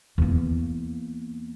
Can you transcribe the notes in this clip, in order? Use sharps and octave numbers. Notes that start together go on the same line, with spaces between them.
E2 A#3